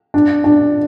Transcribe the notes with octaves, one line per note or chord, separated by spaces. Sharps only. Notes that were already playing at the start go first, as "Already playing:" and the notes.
D4
D4